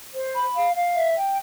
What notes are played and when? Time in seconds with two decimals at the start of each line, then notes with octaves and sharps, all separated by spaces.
0.13 C5
0.34 B5
0.55 F5
0.75 F5
0.94 E5
1.16 G5